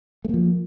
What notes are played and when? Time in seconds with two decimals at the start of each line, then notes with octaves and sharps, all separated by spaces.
0.25 A3
0.29 A#3
0.34 F3